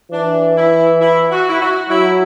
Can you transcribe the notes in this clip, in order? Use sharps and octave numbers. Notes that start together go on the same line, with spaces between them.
E3 D4
E4
E4
F#4
E4
F#4
F#3 E4